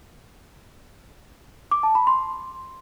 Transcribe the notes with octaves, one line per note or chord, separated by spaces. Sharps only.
D6
A5
B5
C6